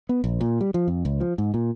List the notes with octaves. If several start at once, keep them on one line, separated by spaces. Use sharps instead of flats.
B3
A#1
A#2
G3
F3
F2
C#2
F3
G#2
A#2